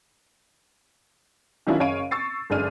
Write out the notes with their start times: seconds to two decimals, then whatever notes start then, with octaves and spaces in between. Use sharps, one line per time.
1.67 D#3 F#3 C#4 D4 E4 F4
1.80 F#1 C#3 C#5 F5 D7 D#7
2.11 C#6 E6 A6 C7
2.50 G1 F#2 G#3 D4 F6 D#7